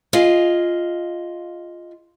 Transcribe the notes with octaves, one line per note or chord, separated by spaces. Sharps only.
F4 G#4 D#5 F5